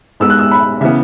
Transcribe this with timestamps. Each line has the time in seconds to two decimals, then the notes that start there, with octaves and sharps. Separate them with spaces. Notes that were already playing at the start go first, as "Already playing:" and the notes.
0.20 G#2 G#3 B3 E6
0.30 F#6
0.39 E6
0.51 B5
0.81 C#3 E3 B3 E5